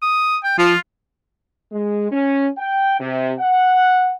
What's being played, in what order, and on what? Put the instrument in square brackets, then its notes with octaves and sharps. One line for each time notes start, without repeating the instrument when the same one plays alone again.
[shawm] D#6
G5
[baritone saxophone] F3 [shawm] F4
[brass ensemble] G#3
C#4
G5
C3
F#5